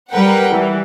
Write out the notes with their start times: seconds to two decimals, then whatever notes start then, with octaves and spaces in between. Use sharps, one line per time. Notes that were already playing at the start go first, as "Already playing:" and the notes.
0.10 G3 A#4 B4 F#5 G5
0.52 E3 G3